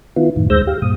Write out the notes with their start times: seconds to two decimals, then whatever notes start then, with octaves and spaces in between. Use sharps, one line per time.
0.16 D#3 B3 E4 F4
0.36 F#2 A2 D#3
0.50 D2 G#3 C5 E6 G6 A#6
0.67 G4 F5
0.82 G2 A#2 D#6